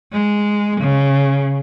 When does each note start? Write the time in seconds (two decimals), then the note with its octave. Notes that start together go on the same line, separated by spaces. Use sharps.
0.12 G#3
0.81 C#3